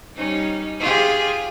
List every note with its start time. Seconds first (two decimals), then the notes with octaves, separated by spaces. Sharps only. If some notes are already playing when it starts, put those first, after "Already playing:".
0.15 G3 C#4 D#4
0.80 F4 G4 G#4